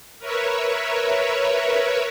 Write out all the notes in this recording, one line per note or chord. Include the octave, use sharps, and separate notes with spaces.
A#4 B4 C#5 E5